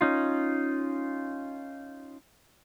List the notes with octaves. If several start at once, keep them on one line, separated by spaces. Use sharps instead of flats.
C#4 D#4 F4